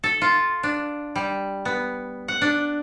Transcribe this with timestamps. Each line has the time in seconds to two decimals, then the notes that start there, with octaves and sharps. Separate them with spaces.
0.04 A4
0.21 F4
0.63 D4
1.16 G3
1.65 B3
2.28 F#5
2.41 D4